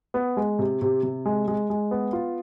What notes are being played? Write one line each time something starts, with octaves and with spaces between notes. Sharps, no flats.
B3
G#3
C3
C3
C3
G#3
G#3
G#3
B3
F4